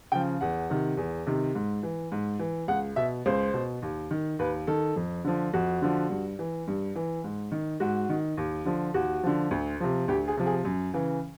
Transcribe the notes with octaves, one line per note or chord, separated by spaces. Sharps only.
C#3 F3 G5
E2 F#5
C3 D#3
E2
C3 D#3
G#2
E3
G#2
E3
C#2 F#5
B2 E5
C#2 C5
B2
D#2
D#3
D#2 B4
D#3 A4
F2
D3 F3
F2 F#4
D3 F3
G2
E3
G2
E3
G#2
D#3
G#2 F#4
D#3
D#2
D3 F3
D#2 F#4
D3 F3
D2
C3 F3
D2 G4
G#4
C3 F3
G#4
F#2
C#3 E3